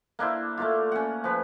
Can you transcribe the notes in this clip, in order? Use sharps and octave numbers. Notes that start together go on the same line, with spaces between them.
A#3 D4 E4 C5
A3 A#3 F4
C#4 F#5
F3 B4